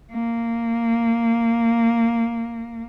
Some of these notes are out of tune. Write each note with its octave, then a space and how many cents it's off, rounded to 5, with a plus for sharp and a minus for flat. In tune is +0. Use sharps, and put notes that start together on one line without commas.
A#3 -10